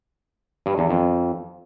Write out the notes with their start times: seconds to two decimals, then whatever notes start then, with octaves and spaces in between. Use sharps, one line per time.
0.66 G2
0.78 E2
0.89 F2